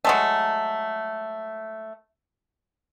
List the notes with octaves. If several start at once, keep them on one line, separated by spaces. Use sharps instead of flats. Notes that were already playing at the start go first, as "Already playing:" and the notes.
F#3 G#3 A3